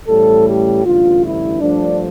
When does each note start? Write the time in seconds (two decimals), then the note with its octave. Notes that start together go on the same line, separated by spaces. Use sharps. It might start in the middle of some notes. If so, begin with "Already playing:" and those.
0.08 A1 A2 G3 A4
0.47 G4
0.85 A1 G2 D3 F4
1.23 E4
1.60 G2 F3 A3 D4